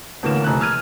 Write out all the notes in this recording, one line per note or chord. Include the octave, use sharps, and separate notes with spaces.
A1 D2 A#3 B3 A#4 E7
F1 F#6
E6 F6 G#6 D#7